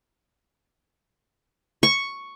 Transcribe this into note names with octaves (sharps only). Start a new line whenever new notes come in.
C#6